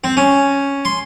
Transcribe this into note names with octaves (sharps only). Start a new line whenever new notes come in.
C4
C#4
C6